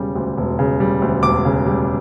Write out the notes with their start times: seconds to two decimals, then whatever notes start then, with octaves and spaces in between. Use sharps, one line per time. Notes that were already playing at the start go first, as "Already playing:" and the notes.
Already playing: E1 C#3 G3
0.15 D2
0.37 E1
0.59 C#3
0.80 G3
1.02 D2
1.23 E1 D6
1.45 C#3
1.66 G3